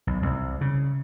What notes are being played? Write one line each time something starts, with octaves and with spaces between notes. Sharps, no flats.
B1
C2
C#3